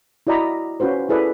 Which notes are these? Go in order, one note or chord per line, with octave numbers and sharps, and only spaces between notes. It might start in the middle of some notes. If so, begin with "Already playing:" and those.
E4 F#4 D5 D#5 A#5 B5
C#4 F4 F#4 B4 C5
E4 F4 G#4 A4 B4 D5